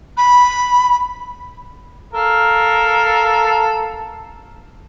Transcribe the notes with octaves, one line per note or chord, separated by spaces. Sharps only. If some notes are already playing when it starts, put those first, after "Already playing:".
B5
A4 A#4 F5